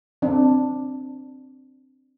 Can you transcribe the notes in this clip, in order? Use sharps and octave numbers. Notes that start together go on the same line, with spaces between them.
C4 D4